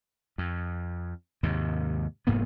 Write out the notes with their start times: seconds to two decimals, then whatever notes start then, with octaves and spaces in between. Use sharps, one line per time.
0.38 F2
1.43 D#2 G#2 C3
2.27 F1 G#2 A#3 B3